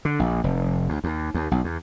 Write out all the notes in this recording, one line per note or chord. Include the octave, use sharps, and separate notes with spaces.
D3
A#1
F1
D2
D#2
D#2
B1
E2